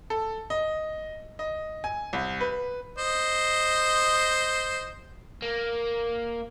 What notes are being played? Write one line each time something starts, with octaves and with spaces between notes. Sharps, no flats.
A4
D#5
D#5
G#5
C2
B4
C5 D#5
A#3